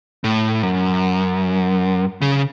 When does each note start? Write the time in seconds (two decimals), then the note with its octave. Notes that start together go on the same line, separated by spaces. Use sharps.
0.24 A2
0.63 F#2
2.22 C#3